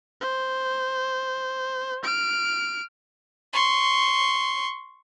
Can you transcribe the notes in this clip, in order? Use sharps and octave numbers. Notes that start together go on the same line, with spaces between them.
C5
F6 D7
C6 C#6